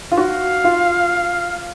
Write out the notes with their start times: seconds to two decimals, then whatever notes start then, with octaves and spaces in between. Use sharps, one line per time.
0.12 F4
0.16 F#4 F5
0.64 F4